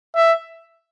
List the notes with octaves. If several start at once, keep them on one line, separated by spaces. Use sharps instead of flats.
E5